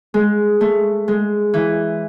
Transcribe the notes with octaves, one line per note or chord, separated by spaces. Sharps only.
G#3
A3
G#3
E3